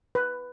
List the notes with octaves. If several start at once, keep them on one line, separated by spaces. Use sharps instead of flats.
B4